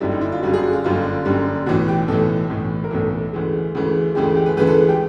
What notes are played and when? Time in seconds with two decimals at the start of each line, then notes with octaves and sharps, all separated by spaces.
0.01 F#1 F#2 D3 G3 E4
0.11 D#4
0.21 E4
0.32 F4
0.42 F#1 F#2 D3 G3 F#4
0.54 G#4
0.63 F#4
0.73 F4
0.84 F#1 F#2 D3 G3 F4
1.25 F#1 F#2 D3 G3
1.66 B1 A2 E3 F#4
1.88 G4
2.08 B1 A2 E3 A4
2.50 B1 A2 E3
2.84 A#4
2.91 B1 A2 E3 A4
3.33 D2 C#3 E3 G#3
3.75 D2 C#3 E3 G#3
4.15 D2 C#3 E3 G#3 G4
4.36 G4
4.46 B4
4.57 D2 C#3 E3 G#3 B4
4.67 A4
4.89 G4